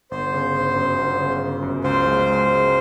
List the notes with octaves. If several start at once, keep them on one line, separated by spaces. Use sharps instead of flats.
G1 C5
C#3
G1
F#2
G1
C#3
G1
F#2
C#2 C5
G#3